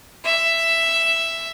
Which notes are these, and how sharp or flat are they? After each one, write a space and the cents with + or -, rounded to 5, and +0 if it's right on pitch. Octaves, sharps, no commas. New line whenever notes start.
E5 +5